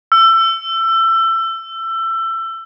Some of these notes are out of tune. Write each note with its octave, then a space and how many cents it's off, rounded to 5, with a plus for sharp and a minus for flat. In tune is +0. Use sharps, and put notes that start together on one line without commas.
E6 +25